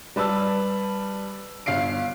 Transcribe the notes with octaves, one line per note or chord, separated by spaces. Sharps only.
G3 B4 A5 E6
G1 F5 C7 D7